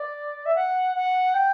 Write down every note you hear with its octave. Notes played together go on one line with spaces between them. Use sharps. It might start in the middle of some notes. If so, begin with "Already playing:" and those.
Already playing: D5
E5
F#5
F#5
G5